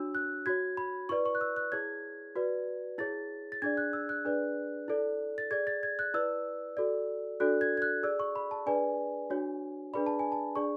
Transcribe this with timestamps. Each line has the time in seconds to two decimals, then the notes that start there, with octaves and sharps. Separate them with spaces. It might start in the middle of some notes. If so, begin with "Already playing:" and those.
Already playing: D4 F#4 C#5 E6
0.15 F#6
0.46 F#4 C#5 G#6
0.77 B5
1.09 E4 B4 D5 C#6
1.26 C#6
1.35 F#6
1.41 E6
1.56 F#6
1.72 E4 G#4 C#5 G#6
2.36 F#4 B4 D5
2.98 E4 G#4 C#5 A6
3.52 A6
3.62 D4 G#4 D5 G#6
3.77 F#6
3.93 E6
4.09 F#6
4.25 D4 G#4 B4 D5
4.88 E4 A4 D5
5.38 A6
5.51 G#4 D5 G#6
5.67 A6
5.83 G#6
5.99 F#6
6.14 E4 B4 D5 E6
6.77 F#4 A4 D5
7.40 D4 F#4 A4 D5 F#6
7.61 G#6
7.77 G#6
7.82 F#6
8.03 G#4 D5 E6
8.20 C#6
8.36 B5
8.51 A5
8.66 D4 G#4 B4 D5 G#5
9.30 D4 F#4 C#5
9.94 D4 G#4 B4 D5 B5
10.06 A5
10.19 G#5
10.32 A5
10.56 D4 G#4 D5 C#6